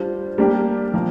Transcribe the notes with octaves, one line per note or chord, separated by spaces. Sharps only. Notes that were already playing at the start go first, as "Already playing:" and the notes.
Already playing: G3 D4 F4 C5
G3 A#3 D4 G4
F3 A#3 F4